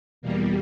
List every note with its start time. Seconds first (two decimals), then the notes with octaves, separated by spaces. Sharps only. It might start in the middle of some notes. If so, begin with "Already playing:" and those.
0.22 E2 B2 G3 A#3